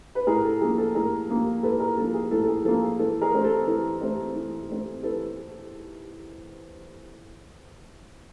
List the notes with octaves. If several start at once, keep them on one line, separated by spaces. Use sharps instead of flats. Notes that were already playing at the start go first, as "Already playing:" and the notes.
B4
A2 G#4 A#4
A4
F3 A#3 G#4
A4
A2 G#4 A#4
F3 A#3
A2 A4 B4
G#4 A#4
F3 A#3 A4
G#4
A2 A4
A4
G#4
F3 A#3 A4
G#4
E3 A4
G#4 A#4
A3 C4
A4
E3 A4
A3 C4
E3
A3 C4
E3 A4 B4